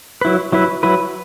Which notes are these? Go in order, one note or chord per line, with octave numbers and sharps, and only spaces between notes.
F#3 E4 B4
F#3 E4 B4
F#3 E4 B4